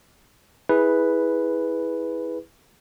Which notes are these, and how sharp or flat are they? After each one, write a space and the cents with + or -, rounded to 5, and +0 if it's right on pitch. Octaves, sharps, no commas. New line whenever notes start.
E4 -20 G#4 +0 B4 +0